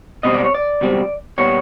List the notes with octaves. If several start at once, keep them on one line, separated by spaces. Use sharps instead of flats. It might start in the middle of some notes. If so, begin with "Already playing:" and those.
C#2 B2 G3 C4 D#5
D5
C#5
D5
C#2 B2 G3 C4
A#2 G3 B3 C#5